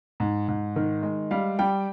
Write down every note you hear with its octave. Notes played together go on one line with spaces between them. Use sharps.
G#2
G#2
D#3
G#3
G3 F5
G3 G5